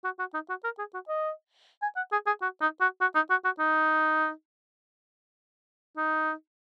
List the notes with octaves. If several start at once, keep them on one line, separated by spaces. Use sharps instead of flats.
F#4
F#4
D#4
F#4
A#4
G#4
F#4
D#5
G#5
F#5
G#4
G#4
F#4
D#4
F#4
F#4
D#4
F#4
F#4
D#4
D#4